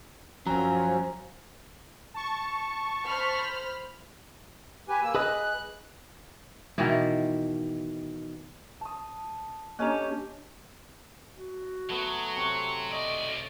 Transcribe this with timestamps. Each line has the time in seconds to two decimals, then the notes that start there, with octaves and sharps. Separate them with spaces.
0.47 F#2 F3 F#3 C4 C#4 A#5
2.14 A5 C#6
3.06 C5 B5 F6
4.89 G4 B4 G#5
5.03 A#3 E6
5.15 G#4 B4 D#5 F#6
6.78 B2 D#3 E3 E4
8.81 A5 D#6
9.79 A#3 C#4 D4 G4 A4 D#5 A#5
11.37 F#4
11.89 F#3 A3 B3
12.36 C3 C#5 C#6
12.91 B1 D5 D#5